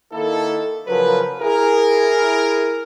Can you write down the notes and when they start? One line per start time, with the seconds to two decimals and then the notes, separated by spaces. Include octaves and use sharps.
0.13 D#3 A#3 E4 A4
0.87 C#3 F3 F#3 A#4 B4
1.40 E4 G#4 A#4